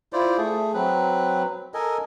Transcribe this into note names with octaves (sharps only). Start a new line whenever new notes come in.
E4 F4 C5 D5
A3 G#4
F#3 C4 B4
A4 A#4 D#5 G#5